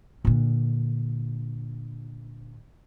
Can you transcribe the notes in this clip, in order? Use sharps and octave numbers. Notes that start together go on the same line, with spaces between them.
A#2 D3